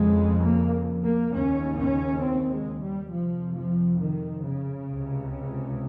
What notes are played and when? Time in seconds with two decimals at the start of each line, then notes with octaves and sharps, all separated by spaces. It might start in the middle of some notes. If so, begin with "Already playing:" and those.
Already playing: F2 C#3 G#3
0.45 A#3
1.04 A#3
1.33 D#2 C#3 C#4
1.78 C#4
2.22 C4
2.51 G#3
2.81 G3
3.10 F2 C3 F3
3.55 F3
3.99 D#3
4.43 C#3
4.88 C#2 C3